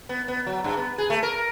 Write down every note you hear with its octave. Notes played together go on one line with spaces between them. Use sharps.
B3
B3
F#3
G2
B3
G#4
A3
A#4